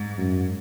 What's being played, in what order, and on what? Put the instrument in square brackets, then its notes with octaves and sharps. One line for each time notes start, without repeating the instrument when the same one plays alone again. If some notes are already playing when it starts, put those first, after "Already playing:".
Already playing: [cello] G#2
[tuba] F#2